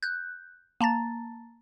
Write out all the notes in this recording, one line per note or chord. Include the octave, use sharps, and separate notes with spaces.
F#6 G6
A#3 A5 A#5 A6